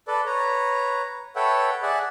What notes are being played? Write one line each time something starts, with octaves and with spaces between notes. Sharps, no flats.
A4 B4 D5
B4 C#5 A#5
A4 B4 C#5 E5 F#5 G5
G#4 D5 E5 F#5